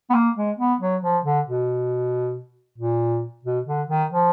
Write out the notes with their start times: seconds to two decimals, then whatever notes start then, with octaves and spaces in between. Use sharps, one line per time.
0.10 B3
0.14 A#3
0.37 G#3
0.59 B3
0.81 F#3
1.03 F3
1.25 D3
1.46 B2
2.78 A#2
3.45 B2
3.67 D3
3.89 D#3
4.11 F3